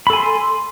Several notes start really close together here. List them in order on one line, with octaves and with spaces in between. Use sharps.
B5 A4 G#5 C6